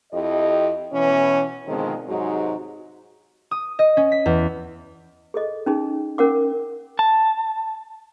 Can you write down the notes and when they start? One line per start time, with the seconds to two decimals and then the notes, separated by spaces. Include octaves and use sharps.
0.12 F2 E4 G4 D#5
0.93 B2 E3 C#4
1.66 B2 D3 D#3 F3 G#3 C4
2.08 G#2 C3 F#3 G#3 D#4 F#4
3.51 D#6
3.79 D#5
3.97 C#4
4.12 B6
4.26 E2
5.34 G#4 A4 D#5
5.66 C#4 D#4 G#4
6.18 C#4 A#4 F#5 D6
6.99 A5